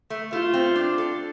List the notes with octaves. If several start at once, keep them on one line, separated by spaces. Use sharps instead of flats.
A3
A3 F4
C4
D4
A4